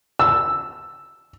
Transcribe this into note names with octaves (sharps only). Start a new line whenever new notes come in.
E6